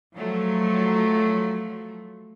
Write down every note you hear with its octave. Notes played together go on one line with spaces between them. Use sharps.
F3 F#3 A3